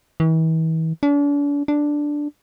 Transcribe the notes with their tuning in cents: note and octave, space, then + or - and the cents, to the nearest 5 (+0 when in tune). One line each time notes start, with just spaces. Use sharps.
E3 -40
D4 -40
D4 +0